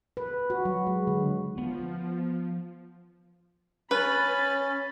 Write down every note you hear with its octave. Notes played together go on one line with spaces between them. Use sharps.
B4
F#4
F#3
G#3
D3
F3 B3
C#4 B4 B5 A6